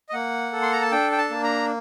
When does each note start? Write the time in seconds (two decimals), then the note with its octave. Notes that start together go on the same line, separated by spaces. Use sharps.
0.09 D#5
0.13 A#3 F#5
0.53 A4
0.62 C6
0.72 A#5
0.82 A5
0.92 D4 G5
1.12 G5
1.18 A5
1.31 A#3
1.44 A#5